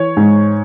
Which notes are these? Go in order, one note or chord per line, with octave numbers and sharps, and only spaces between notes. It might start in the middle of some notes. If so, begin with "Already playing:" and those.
Already playing: E3 C#5
G#2